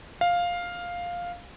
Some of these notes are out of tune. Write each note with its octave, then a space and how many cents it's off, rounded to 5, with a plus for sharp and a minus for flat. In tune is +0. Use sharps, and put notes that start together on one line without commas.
F5 +5